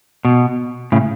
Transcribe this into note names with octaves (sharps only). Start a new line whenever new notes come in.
B2
A2 C#3